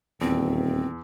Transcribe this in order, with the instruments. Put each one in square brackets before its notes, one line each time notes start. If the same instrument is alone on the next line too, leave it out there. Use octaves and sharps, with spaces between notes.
[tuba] D#1 [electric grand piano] E2 [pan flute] C4